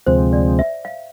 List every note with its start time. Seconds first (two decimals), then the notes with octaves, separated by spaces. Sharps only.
0.06 D2 C3 F3 G#3 C4 C5
0.33 D5
0.59 E5
0.85 F5